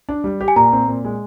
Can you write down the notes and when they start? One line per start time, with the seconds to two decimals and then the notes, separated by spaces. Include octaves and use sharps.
0.09 D4
0.24 G3
0.41 G4
0.48 G#5
0.56 A#2 A#5
0.73 C4
0.88 A#2
1.05 G#3